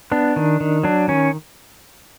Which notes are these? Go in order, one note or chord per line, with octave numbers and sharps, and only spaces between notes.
B3 D4
D#3
D#3
F#3 D4
D#3 C#4